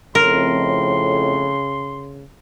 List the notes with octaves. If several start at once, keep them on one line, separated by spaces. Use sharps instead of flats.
F2 A2 C#3 A#4 C6